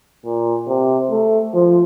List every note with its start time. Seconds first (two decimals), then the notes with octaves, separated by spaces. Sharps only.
0.25 A#2
0.68 C3
1.11 A3
1.54 F3